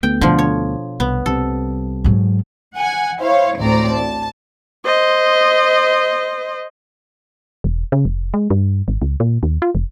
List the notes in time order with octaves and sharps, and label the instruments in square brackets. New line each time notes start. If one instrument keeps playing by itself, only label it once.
[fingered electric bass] D2 A3 B3 [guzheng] G5
[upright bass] B2 [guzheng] D3 F3
[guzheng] C#5
[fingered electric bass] C2 [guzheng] B3
[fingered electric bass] C2 G3 C4 [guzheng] A4
[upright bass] G#2 F#3
[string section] F#5 G#5
E4 C5 C#5 F5
A1 D2 A2 C4 D5 A#5
A5
[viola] C5 D#5
[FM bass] E1
C#3
F1
G#3
G2
G#1
C#2
A#2
D#2
F4
F1